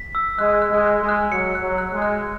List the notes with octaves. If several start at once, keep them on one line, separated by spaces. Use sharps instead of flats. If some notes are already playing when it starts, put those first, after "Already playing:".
Already playing: B6
E6
G#3 F#6
F#6
G#3
F#6
G#3
F#6
F#3 C#7
F#6
F#3
F#6
G#3
F#6